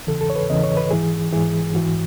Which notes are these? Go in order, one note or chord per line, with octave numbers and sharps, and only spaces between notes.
E2 C#3 E3 A4
A4
C#5
B4
E2 C#3 E3 D#5
C#5
B4
G#2 E3 G#4
G#2 E3 G#4
G#2 E3 F#4